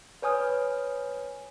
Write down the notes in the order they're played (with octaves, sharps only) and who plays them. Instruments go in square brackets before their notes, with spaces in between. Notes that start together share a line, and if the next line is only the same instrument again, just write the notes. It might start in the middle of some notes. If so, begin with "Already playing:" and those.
[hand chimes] B4 C#5 G#5 D#6 F6